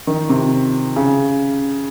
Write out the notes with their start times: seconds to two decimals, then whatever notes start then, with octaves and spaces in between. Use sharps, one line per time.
0.07 D#3
0.29 C3
0.96 C#3